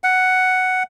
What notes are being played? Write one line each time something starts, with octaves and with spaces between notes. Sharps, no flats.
F#5